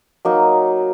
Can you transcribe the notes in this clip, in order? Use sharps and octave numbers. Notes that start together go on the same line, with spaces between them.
F#3 A#3 D#4